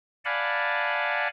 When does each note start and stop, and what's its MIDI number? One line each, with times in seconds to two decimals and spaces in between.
0.25 1.28 74
0.25 1.28 77
0.25 1.28 78
0.25 1.28 80
0.25 1.28 81
0.25 1.28 83